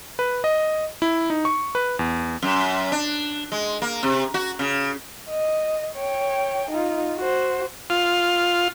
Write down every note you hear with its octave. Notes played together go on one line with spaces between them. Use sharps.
B4
D#5
E4
D#4
C#6
B4
E2
F#2
D4
G#3
A#3
C3
F#4
C#3
D#5
C#5 G5
D#4 F4
F#4 C5
F4